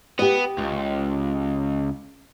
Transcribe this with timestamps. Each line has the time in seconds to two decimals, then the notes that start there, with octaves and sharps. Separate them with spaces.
0.19 B3 G4 D#5
0.59 C#2